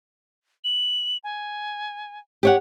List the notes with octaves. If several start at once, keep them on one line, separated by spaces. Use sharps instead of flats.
F#7
G#5
G4 C#5 F#5